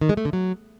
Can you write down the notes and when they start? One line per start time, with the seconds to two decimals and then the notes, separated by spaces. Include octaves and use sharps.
0.01 D#3
0.09 G#3
0.17 A3
0.25 D3
0.33 F#3